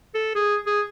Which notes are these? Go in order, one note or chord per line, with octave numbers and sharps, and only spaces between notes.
A4
G#4
G#4